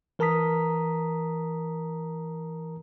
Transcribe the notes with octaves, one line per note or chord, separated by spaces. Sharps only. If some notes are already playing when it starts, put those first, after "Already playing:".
E3 A#4 A5 A#5 D#6 B6